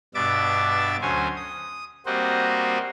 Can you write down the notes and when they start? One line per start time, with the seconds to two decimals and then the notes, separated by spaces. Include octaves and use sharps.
0.15 G2 B2 D4 E5 D6 A6
1.02 D2 F#3 C#4 C5 G#5
1.36 D#6
2.06 G3 A#3 C4 F#4 C5 D#5